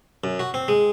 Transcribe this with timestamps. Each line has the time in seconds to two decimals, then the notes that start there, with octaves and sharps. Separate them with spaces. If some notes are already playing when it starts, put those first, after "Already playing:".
0.24 F#2
0.40 F#4
0.54 C4
0.68 G#3